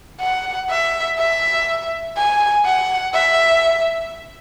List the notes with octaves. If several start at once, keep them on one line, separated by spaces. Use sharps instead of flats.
F#5
E5
E5
G#5
F#5
E5